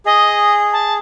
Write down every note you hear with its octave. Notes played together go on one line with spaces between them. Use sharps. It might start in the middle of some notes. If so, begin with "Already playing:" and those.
G#4 D#5
A5